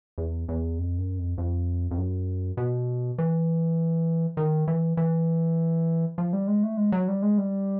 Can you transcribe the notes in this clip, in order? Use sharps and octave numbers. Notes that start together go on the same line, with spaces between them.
E2
E2
F2
F#2
F2
F2
F2
F#2
B2
E3
D#3
E3
E3
F3
G3
G#3
A3
G#3
F#3
G3
G#3
G3